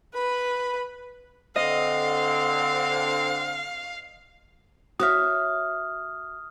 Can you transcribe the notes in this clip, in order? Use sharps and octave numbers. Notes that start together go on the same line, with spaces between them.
B4 B5
D3 C4 D#5 F5
F#4 C#5 E5 D#6 F6